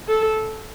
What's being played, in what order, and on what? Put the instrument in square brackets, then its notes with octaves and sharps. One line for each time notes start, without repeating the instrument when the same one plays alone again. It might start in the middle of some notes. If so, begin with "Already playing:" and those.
[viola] A4